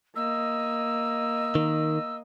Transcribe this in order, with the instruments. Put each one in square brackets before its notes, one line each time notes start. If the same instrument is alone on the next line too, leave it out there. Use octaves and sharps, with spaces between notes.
[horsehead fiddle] A#3 D#5 [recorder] E6
[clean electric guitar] D#3